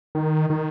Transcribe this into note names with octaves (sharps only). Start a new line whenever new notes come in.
D#3
D#3